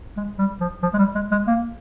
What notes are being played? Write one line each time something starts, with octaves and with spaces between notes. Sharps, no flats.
G#3
G3
F3
F3
G#3
G3
G#3
G#3
A#3